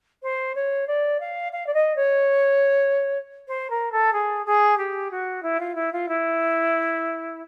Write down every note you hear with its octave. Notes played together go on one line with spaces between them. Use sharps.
C5
C#5
D5
F5
F5
D5
D#5
C#5
C5
A#4
A4
G#4
G#4
G4
F#4
E4
F4
E4
F4
E4